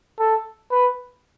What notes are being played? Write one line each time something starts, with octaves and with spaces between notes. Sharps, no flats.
A4
B4